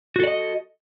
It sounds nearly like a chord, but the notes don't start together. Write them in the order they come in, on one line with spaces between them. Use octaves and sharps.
F#4 A4 D5 D#5